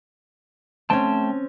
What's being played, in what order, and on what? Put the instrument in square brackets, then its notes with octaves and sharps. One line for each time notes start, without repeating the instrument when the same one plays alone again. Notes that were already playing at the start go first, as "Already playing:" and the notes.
[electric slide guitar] A3 G5 A5 [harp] C4 C#4